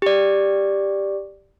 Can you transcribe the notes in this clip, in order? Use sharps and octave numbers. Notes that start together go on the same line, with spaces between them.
G4 D5